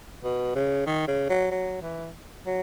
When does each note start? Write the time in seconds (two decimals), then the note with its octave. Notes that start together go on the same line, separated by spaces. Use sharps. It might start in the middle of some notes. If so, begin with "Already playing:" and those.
0.23 B2
0.55 C#3
0.86 D#3
1.08 C#3
1.29 F#3
1.51 F#3
1.82 E3
2.46 F#3